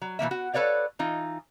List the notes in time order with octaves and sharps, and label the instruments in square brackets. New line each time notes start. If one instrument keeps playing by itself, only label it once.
[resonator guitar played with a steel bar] F#3
B2 E3 A#3 E5
F#4
A4 B4 C#5 D5 F5
E3 D#4 F4